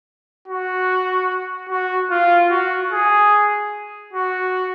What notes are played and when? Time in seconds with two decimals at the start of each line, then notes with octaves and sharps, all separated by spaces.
0.48 F#4
1.69 F#4
2.11 F4
2.51 F#4
2.91 G#4
4.13 F#4